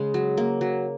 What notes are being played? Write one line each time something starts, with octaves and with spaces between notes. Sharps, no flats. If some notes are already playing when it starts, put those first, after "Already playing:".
Already playing: C#3 G#3
F#3
A#3
F#3